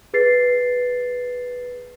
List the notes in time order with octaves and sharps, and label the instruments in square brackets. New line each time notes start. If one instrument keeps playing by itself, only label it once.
[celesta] G#4 B4 A6 C7